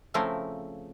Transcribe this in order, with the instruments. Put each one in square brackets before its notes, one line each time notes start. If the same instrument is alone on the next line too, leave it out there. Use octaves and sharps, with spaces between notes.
[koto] C#3 F3 A3 C4 E4 A#4